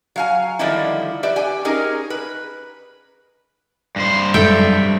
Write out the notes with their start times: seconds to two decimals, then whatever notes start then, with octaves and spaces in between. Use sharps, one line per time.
0.16 F#3 F5 G#5
0.59 D3 D#3 F3 G3 D#4 E4
1.23 G4 B4 D5 E5
1.36 G4 G5 G#5
1.65 C#4 D#4 G#4 A#4
2.10 B4
3.96 G2 C5
4.34 F#2 F#3 G#3 A4 E5 G5